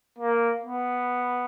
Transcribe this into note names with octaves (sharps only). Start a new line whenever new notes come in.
A#3
B3